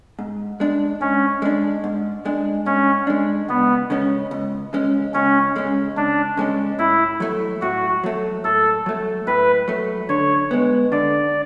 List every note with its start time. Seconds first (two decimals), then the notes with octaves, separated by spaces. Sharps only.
0.19 G#2
0.60 G#3 D4
1.01 G#2 C#4
1.42 G#3 D4
1.84 G#2
2.25 G#3 D4
2.66 G#2 C#4
3.07 G#3 D4
3.49 C#2 B3
3.90 C#3 G#3 C#4
4.31 C#2
4.73 C#3 G#3 C#4
5.14 C#2 C#4
5.56 C#3 G#3 C#4
5.96 C#2 D4
6.37 C#3 G#3 C#4
6.79 A2 E4
7.20 F#3 A3
7.61 A2 F#4
8.04 F#3 A3
8.44 A2 A4
8.86 F#3 A3
9.27 A2 B4
9.68 F#3 A3
10.09 D3 C#5
10.51 G#3 B3
10.92 D3 D5